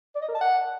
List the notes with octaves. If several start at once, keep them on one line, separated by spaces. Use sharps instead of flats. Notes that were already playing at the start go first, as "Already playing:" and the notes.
D5
D#5
A#4
A5
F#5